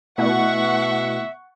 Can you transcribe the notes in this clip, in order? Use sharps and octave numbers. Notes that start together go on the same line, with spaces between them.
B2 A3 B3 E4 E5 F#5 C#6